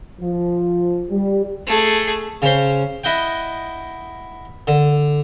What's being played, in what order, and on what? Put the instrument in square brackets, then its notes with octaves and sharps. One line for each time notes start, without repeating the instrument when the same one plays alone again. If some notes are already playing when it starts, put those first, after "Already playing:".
[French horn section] F3
G3
[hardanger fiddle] A3 G#4
[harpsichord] C#3 C#4 C5
E4 D#5 F#5 G5
D3